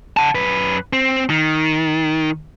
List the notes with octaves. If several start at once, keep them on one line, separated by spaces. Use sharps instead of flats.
F#5 A5
F#2 B4
C4
D#3